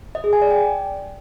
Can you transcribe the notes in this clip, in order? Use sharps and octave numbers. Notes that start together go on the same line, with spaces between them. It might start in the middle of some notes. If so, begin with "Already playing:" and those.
D#5
G#4
G#5
D5
G5